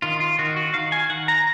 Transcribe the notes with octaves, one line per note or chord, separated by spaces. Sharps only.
D#3 F4
F4
D#3 F#4
F#4
D#3 F5
G#5
D#3 F#5
A#5